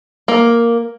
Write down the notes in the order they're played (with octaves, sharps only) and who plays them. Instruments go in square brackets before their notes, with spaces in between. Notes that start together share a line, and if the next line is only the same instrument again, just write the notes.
[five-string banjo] A#3